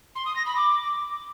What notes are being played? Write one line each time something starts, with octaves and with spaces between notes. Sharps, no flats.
C6
D#6
A#6
B5
D6